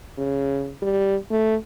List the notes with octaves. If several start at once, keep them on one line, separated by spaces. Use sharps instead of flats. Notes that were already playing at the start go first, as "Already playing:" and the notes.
C#3
G3
A3